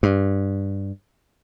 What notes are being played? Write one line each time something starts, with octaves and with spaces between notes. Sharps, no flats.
G2